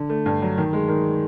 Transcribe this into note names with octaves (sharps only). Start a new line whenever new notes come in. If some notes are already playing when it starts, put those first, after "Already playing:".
Already playing: D3
A3
G2
F#3
D#3
G#3
D#3